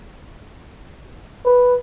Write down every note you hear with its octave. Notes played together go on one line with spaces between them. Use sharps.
B4